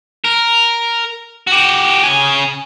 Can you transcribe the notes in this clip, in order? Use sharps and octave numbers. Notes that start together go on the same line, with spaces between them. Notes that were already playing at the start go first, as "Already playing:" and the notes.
A#4
F#4 G4
C#3 G#5